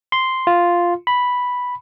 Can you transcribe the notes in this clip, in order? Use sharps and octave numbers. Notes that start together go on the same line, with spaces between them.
C6
F4
B5